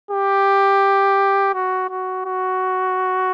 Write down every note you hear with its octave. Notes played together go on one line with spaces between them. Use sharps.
G4
F#4
F#4
F#4